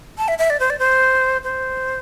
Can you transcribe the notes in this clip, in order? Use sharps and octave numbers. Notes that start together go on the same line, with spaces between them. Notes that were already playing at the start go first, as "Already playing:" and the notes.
A5
E5
E5
D5
C5
D5
C5
C5